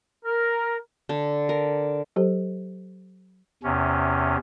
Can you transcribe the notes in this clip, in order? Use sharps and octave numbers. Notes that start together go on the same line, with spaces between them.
A#4
D3
A#4
F#3 G4 A4 C5
E2 C3 C#4